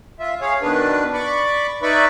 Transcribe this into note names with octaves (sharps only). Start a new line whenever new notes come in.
F4 E5
G#4 C#5 F5
B2 D#3 D4 B4
D5 B5 C#6 D6
D#4 B4 D5 E5 B5 C#6